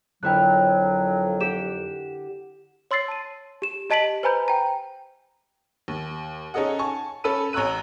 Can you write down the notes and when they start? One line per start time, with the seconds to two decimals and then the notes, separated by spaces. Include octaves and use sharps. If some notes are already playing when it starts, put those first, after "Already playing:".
0.23 F2 D3 F#3 E4 A#4 G5 F#6
1.41 G4 F#5 E7
2.91 C#5 C6 E6 A6 C7
3.08 A5 D#7
3.62 G4 E7
3.90 G4 D#5 A5 B6 D7 F#7
4.23 B4 C5 G#5 A#5 B5 G6
4.48 G5 A#5
5.88 D#2
6.54 C#4 D#4 G#4 A4 D#5 F#5
6.79 G#5 A5 C#6
7.24 C#4 A4 A5 B5 E6 D#7
7.53 A1 C#5 A#5 E6 F#6 D#7